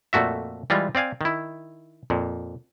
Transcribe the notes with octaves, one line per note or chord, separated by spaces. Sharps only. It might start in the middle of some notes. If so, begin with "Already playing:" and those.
F2 A#2 A3 F#4 E5
E3 G3 G#3 F4
C4 D5 F5 G#5
D#3 E4
F2 A#2